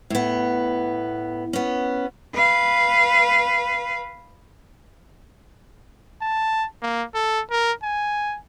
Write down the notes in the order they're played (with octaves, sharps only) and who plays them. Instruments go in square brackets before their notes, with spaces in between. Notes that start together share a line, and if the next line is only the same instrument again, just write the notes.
[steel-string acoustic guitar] A2 B3
B3 C#4
[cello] B4 F5
[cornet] A5
A#3
A4
A#4
G#5